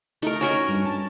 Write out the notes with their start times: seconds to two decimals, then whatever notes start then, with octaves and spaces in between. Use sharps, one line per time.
0.22 A3 D#4 A#4
0.41 C#4 F#4 A#4
0.68 G2
0.85 A5